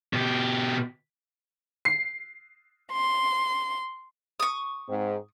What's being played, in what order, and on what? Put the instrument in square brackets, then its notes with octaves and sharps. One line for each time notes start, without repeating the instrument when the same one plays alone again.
[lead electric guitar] B2 G4
[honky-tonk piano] C7
[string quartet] C6
[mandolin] C#6 D#6
[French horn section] G#2 C4